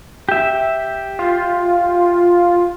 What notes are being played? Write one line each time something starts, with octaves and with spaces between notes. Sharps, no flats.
G4 E5
F4